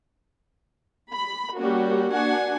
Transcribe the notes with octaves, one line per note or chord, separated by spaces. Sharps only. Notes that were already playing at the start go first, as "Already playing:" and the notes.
B5
G3 A#3 C#4 F#4
A#3 D4 F#4 F#5 G#5